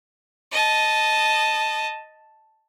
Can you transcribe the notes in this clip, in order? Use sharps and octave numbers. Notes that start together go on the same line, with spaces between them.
D#5 A5